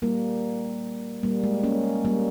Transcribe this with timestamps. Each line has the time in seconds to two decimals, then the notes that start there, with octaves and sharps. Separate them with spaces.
0.02 G3 A#3
1.23 G3 A#3
1.44 G#3
1.63 A#3 C#4
2.05 G3 A#3